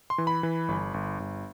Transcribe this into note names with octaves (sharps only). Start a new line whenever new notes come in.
C6
E3
B5
E3
G1
G1
G1